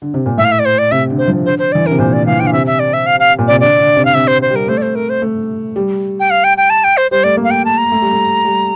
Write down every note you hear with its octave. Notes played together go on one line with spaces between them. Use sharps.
D3
C3
A#2
A2 E5
F5
E5
D5
C5
D5
C3 E5
D3
C5
F3
D3 C5
C5
E3 D5
D3
C3 A#4
A#2 C5
D5
E3 F5
D3 G5
F5
C3 E5
E5
D5
E5
F5
F5
A#2
C3 D5
D3 D5
D3
C3
F5
C3 E5
C5
C5
G3
A#4
A3 C5
D5
C5
A#4
C5
A3
G3
G5
F5
G5
G5
A5
G5
C5
G3 C5
A3 D5
A#3
F5
G5
A5
A#5
A3
G3
A3
G3